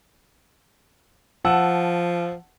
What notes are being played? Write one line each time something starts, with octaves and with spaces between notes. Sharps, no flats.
F3 F#5 A5 E6